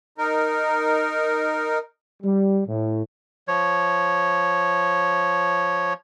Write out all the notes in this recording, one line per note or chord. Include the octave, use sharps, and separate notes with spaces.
D#4 A#4
G3
A2
F3 C#5